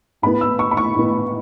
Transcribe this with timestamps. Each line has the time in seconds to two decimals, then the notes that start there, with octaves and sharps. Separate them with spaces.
0.22 A2 E3 B3 B5
0.41 E6
0.59 C#6
0.71 B5
0.77 C#6
0.96 A2 E3 B3